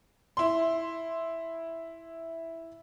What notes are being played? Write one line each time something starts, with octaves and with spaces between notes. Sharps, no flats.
E4 C6